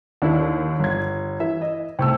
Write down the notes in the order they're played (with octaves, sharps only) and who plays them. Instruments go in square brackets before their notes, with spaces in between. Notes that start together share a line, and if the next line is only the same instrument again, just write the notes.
[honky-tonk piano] D#2 D3 [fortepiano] D4 E4
[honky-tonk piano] G1 G#6
[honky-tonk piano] E3 [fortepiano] E5
[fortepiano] D#5
[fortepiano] C2 A3 [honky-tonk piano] G5 E6